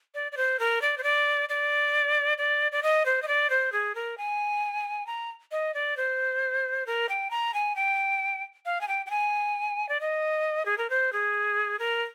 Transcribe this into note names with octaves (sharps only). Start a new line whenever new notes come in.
D5
D5
C5
A#4
D5
C5
D5
D5
D5
D5
D#5
C5
D#5
D5
C5
G#4
A#4
G#5
A#5
D#5
D5
C5
A#4
G5
A#5
G#5
G5
F5
G#5
G5
G5
G#5
D5
D#5
G#4
A#4
C5
G#4
A#4